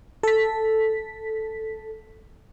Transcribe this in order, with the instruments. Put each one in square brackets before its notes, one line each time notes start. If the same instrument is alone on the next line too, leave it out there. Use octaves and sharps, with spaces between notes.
[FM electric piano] A4 B6